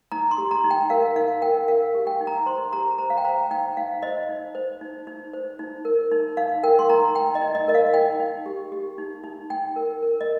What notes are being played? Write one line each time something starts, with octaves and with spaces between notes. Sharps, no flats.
D#4 A#5
C6
G4
A#5
D#4
G5
A#4 F5
D#4 F5
A#4 G5
A#4 F5
G4
G5
D#4
A#5
C5 C6
G4 A#5
C5 A#5
F5
G5
C5 A#5
D#4 G5
D#4 F5
C5 D#5
D#4
C5
D#4
D#4
C5
D#4
A#4
D#4
D#4 F5
A#4 G5
C6
D#4 A#5
D#4 G5
D#5
D#4
D#5
A#4 D#5
F5
D#4 G5
D#4
G4
G4
D#4
D#4
D#4 G5
A#4
A#4
D#5